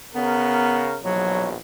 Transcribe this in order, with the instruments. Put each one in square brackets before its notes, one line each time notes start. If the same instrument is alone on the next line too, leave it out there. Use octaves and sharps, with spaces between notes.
[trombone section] C#3 A#4 [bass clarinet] B3
[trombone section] A#1 E2 B2 [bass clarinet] F#3